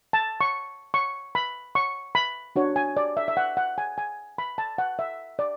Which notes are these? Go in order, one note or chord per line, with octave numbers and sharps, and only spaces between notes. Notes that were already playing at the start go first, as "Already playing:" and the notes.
A5
C#6
C#6
B5
C#6
B5
D4 F#4 C#5
G#5
D5
E5
E5
F#5
F#5
G#5
G#5
B5
A5
F#5
E5
D5